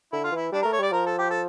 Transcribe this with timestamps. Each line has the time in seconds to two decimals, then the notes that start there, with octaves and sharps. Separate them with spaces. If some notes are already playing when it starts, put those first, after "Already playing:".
0.12 D3 E4
0.24 F4
0.32 E3 E4
0.52 G3 D4
0.62 A#4
0.65 A3
0.73 C#5
0.79 G3 D5
0.92 F3 A#4
1.06 A4
1.19 G4
1.30 A4